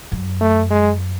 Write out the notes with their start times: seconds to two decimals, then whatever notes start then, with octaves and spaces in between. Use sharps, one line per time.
0.12 F#2
0.41 A3
0.70 G#3